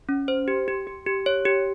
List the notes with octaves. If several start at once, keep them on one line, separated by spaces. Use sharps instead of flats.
C#4
C5
G4
G4
G4
G4
C#5
G4